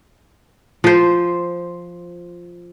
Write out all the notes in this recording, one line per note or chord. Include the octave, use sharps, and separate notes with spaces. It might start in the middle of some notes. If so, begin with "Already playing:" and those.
F3 C5